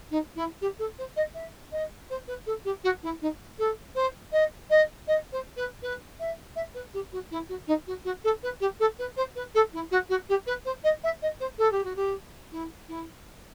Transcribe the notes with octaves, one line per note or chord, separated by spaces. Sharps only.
D#4
E4
G4
A4
C5
D#5
E5
D#5
C5
B4
A4
G4
F#4
E4
D#4
A4
C5
D#5
D#5
D#5
C5
B4
B4
E5
E5
B4
G4
F#4
E4
F#4
D#4
F#4
F#4
A4
B4
G4
A4
B4
C5
B4
A4
E4
F#4
F#4
G4
B4
C5
D#5
E5
D#5
C5
A4
G4
F#4
G4
E4
E4